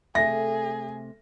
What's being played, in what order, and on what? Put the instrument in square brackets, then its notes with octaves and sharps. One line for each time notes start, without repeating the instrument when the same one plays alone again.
[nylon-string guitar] C3 A3 [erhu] G#4 [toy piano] E5 [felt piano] A#6